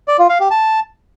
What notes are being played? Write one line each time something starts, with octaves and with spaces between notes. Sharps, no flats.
D5
F4
F5
G4
A5